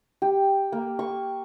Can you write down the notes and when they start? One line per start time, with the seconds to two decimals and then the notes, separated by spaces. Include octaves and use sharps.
0.22 G4
0.72 A#3
0.99 C#6